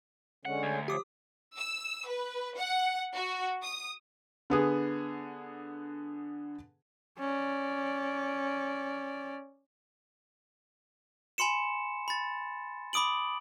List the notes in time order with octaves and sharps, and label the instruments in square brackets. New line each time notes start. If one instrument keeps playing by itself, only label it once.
[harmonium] D3 G#3 C#4 [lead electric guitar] F#5
[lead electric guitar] D2
[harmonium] F3 F#3 [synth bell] G4 D6 D#6
[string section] E6
B4
F#5
F#4
D#6
[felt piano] D3 B3 G#4
[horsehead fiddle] C#4 D5
[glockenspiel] G#5 B5 C6 C#7 E7
B5 A6
B5 D6 D#6 D7 F#7